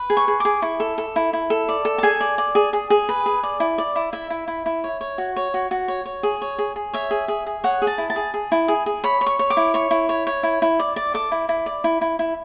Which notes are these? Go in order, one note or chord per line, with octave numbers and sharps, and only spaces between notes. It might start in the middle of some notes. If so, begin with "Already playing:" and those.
Already playing: B4
G#4
C#6
G#4
G#4 D6
E4 C#6
A4
A4
E4
E4
A4
D5
A4
A5
G#4 G#5
D5
D5
G#4
G#4
G#4
B4
G#4
D5
E4
D5
E4
E4 E5
E4
E4
E4
C#5
C#5
F#4
C#5
F#4
F#4
C#5
C#5
G#4
C#5
G#4
G#4
C#5 E5
G#4
G#4
G#4
C#5 F#5
G#4
A5
E4
A5
G#4
G#4
E4
G#4
G#4
C#5 B5
C#5
C#6
C#5
D6
E4
C#5 C#6
E4
C#5
C#5
E4
E4
D5
D5
A4 D6
E4
E4
D5
E4
E4
E4